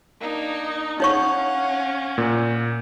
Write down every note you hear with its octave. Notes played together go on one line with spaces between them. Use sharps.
A#3 D4 D#4
C#4 D#4 C#5 F5 F#5 C#6
A#2